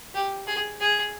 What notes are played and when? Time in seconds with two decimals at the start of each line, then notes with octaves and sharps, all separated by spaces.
0.14 G4
0.47 G#4
0.80 G#4